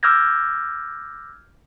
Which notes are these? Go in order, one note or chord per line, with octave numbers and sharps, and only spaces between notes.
D6 E6 F6 G6 G#6 A#6